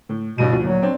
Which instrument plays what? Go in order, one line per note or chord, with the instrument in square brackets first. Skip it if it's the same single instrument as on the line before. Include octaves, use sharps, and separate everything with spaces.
[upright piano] A2
[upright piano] A1 G2 D#7 [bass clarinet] B2
[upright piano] D2 F3
[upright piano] A#2 [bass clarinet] F#3
[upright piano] C4 D4 C#5